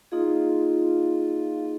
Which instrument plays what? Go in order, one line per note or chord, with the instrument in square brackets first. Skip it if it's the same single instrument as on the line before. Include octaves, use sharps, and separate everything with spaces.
[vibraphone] A#3 D#4 G#4 D#5 [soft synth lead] F4